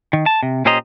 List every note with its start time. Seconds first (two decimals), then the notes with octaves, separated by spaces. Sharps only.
0.13 D#3
0.26 A5
0.43 C3
0.65 A#2 C#4 G4 C5 D#5 A#5